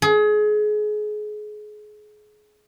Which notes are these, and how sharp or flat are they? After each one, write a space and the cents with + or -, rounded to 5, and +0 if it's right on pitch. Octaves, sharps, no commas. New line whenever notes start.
G#4 +30